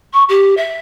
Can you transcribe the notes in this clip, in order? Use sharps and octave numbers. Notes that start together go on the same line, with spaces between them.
C#6
G4
E5